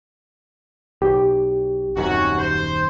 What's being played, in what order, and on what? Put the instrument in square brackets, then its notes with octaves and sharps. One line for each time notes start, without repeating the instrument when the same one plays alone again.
[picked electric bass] B1 [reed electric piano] G4
[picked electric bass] D#1 F#2 D#3 [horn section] C3 C#4 F#4
[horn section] C5